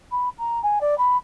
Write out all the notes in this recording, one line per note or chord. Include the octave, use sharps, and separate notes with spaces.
B5
A#5
G#5
D5
B5